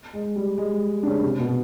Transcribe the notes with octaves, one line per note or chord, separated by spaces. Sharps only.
G#3
G3
G#3
D4
C#3 C#4
C3 C4
B2 B3